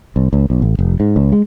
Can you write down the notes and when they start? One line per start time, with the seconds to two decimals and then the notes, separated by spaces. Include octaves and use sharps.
0.16 C2
0.33 C#2
0.50 B1
0.62 A1
0.79 F1
1.00 G#2
1.16 C#2
1.32 G#3